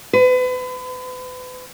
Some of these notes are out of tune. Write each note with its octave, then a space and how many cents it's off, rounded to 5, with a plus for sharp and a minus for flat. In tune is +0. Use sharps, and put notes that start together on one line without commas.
B4 +35